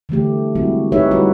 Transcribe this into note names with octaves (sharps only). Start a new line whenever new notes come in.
D3 E3 A3 G4
G3 G#3 C4 E4 F#4
D#4 G4 G#4 B4 C#5 E5
G3 E4 F#4 B4